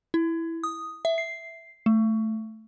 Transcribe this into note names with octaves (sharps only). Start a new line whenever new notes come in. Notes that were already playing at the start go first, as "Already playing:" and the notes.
E4
D#6
E5
C7
A3